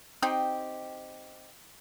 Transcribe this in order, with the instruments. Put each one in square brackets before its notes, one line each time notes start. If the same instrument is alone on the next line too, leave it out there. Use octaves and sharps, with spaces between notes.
[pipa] C4 D#4 G4